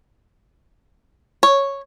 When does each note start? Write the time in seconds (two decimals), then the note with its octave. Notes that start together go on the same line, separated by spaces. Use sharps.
1.43 C#5